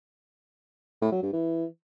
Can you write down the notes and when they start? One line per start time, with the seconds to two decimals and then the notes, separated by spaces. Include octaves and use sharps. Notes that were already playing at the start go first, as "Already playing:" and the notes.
1.01 A2
1.12 F#3
1.22 G2
1.33 E3